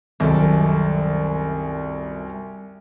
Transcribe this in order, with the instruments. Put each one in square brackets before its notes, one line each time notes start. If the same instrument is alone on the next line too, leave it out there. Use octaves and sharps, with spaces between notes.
[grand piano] C2 F#2 [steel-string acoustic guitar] D#3 A4